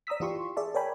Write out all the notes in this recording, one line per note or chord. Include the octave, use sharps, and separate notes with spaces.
D5 A#5 D#6 E6 B6
E3 F4 G4 C6 C#6
G#4 D5 E5 A5
A#4 C#5 D5 G5 G#5 B5